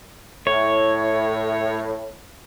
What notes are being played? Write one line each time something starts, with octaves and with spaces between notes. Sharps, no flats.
A2 C#5